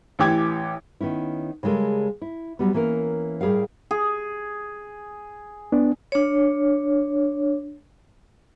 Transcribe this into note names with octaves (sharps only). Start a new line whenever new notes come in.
A1 E3 G4 D6 G#6
D#3 B3 C#4 E4
C#3 G3 G#3 A4 A#4
E4
F#3 G3 B3
E3 A#3 C#4 A#4
A2 G3 G#4 A#4 F5
G#4
B3 D4
D4 C#5